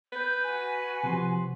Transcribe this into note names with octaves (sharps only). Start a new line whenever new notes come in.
B4 G6
F#4 G#5
C3 F3 C6